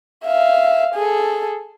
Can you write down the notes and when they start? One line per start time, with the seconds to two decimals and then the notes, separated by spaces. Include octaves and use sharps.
0.24 E5 F5
0.95 G#4 A4